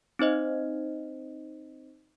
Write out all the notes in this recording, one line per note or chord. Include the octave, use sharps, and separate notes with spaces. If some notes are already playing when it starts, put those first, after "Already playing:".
C4 D#4 C5 D#5